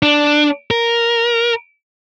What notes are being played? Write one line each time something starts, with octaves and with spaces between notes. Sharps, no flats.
D4
A#4